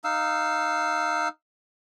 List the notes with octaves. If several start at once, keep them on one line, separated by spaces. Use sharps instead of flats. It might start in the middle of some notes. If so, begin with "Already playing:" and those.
D#4 F5 E6